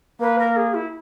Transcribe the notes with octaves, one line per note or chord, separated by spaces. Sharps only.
A#3 B4
A#4
G#4
E4